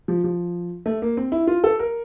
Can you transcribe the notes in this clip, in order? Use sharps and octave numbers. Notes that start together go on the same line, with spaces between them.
F3
F3
A3
A#3
C4
E4
F4
A4
A#4